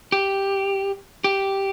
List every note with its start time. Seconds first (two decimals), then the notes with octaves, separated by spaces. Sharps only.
0.12 G4
1.24 G4